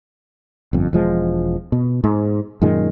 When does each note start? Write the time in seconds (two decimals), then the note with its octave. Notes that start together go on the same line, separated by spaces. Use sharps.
0.73 G1 F2
0.93 E1 F3 G#3
1.72 B2
2.04 G#2
2.62 F#2 A#2 D#3 G#3